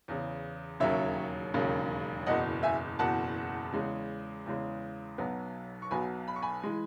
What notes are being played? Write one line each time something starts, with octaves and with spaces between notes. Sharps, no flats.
E2 C#3 E3
E1 D#2 C#3 F#3 C#4 C#5 E5
E1 D#2 C#3 F#3 C#4
F#1 E2 B2 D#5 F#5
E5 G#5
F#1 E2 B2 F#5 A5
E2 C#3 G#3
E2 C#3 G#3
B1 B2 F#3 B3
C#6
B1 B2 F#3 B3 G#5 B5
B5
C#6
G#5 B5
E3 G#3